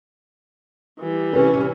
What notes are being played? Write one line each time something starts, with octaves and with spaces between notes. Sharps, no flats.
E3 G3
C3 C#4 B4